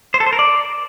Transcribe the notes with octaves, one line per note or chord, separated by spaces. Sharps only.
C5
A4
C5
A#4
D5